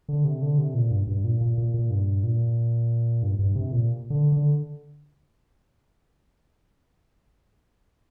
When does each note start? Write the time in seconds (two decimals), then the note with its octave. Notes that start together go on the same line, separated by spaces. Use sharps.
0.09 D3
0.25 C3
0.42 D3
0.58 C3
0.74 A#2
0.90 G2
1.07 G2
1.24 A#2
1.41 A#2
1.58 A#2
1.74 A#2
1.90 G2
2.24 A#2
3.23 G2
3.39 G2
3.55 C3
3.71 A#2
4.10 D3
4.32 D3